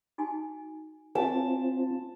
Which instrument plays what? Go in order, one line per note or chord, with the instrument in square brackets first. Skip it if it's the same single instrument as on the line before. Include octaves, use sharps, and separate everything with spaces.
[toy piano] D#4 F#4 G#5
[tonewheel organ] C4 F4 [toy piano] E5 F5 G#5 [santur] A5